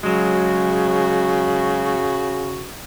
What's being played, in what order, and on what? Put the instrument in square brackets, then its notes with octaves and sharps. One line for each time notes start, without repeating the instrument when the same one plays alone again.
[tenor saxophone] C#3 [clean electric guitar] F#3 G#3 [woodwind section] F#4